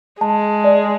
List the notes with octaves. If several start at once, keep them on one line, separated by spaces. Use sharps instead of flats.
G#3 A5
D5